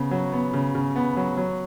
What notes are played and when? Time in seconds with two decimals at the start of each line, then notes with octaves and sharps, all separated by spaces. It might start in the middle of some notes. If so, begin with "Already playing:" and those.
Already playing: C#3 B3
0.11 F#3
0.33 B3
0.54 C#3
0.75 C#3
0.96 B3
1.17 F#3
1.37 F#3